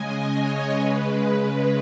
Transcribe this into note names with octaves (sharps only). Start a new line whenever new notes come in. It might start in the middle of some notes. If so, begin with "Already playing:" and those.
Already playing: C#3 G#3 D#5 G#5
C#5
C#3 G#3 B4